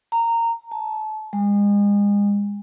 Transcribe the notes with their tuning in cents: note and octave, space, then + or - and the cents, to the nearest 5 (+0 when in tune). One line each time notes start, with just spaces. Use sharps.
A#5 -15
A5 -30
G#3 -35